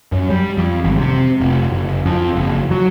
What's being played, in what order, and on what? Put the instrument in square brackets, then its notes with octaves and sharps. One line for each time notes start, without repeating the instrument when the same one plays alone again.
[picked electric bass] F#2
G3
F2
G#1
C3
F1
F#1
F2
F#1
F#3